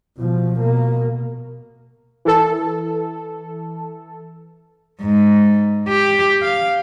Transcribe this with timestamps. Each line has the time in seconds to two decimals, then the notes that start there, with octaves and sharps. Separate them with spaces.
0.18 B2 F3
0.60 B2 A#3
2.25 E3 A4
5.01 G#2
5.89 G4
6.42 F5